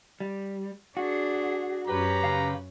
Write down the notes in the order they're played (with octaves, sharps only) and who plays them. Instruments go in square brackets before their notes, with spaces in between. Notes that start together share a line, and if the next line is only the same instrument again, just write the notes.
[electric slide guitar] G3
[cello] D4 G#4 [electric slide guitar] F#4
[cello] F#2 C#4 [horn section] G4 B4 [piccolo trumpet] A#5
[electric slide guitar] C#3 F5